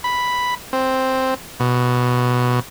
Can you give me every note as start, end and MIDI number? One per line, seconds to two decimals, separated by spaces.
0.04 0.55 83
0.73 1.34 60
1.60 2.60 47